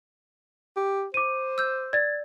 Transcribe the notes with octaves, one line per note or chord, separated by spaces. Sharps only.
G4
C5 D6 D#7
E6 G6
D5 G#6 A6